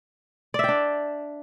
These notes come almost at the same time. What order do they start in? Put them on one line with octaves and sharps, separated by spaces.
D5 E5 G5 D4